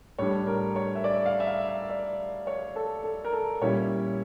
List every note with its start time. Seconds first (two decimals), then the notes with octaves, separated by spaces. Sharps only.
0.19 A2 G3 D4 C#5
0.47 A#4
0.76 C#5
0.95 E5
1.04 D5
1.26 F5
1.40 E5
1.47 F5
1.69 E5
1.90 D5
2.47 C#5
2.76 A4
3.04 A4
3.25 A#4
3.33 A4
3.61 A#2 G3 C#4 E4 C#5